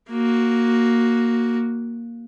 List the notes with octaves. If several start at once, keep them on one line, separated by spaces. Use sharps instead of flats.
A#3 F#4